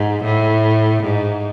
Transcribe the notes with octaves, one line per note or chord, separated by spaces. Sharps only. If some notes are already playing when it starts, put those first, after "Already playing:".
Already playing: G#2
A2
G#2